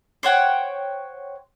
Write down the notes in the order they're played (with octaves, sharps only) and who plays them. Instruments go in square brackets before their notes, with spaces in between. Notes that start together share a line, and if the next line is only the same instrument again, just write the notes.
[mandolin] C5 C#5 F#5 G5